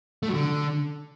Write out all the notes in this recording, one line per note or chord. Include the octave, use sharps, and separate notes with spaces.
A3
F#3
D3